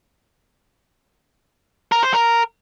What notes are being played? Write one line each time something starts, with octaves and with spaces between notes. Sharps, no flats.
A#4
C5
A#4